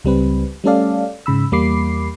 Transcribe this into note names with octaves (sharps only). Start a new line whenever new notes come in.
C#2 G3 C4 B4
G3 A3 C#4 A4 D5 F5
G#2 C#3 B5 E6
E2 G3 A#3 B5 D6 C7